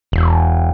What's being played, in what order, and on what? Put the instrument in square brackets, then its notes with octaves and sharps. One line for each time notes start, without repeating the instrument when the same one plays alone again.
[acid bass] E1